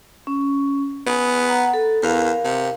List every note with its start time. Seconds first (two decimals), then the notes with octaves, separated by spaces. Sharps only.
0.27 C#4
1.07 B3 G#5 D#6
1.49 F#5 A#5
1.74 A4
2.03 E2 A#4 F5
2.45 C3